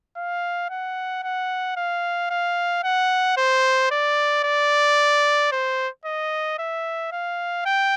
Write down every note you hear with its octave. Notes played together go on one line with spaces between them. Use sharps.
F5
F#5
F#5
F5
F5
F#5
C5
D5
D5
C5
D#5
E5
F5
G5